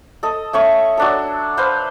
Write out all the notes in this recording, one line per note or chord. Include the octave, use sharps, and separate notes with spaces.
A4 D#5
A3 C#4 C#6
F#3 D4 A4
B4 C5 F5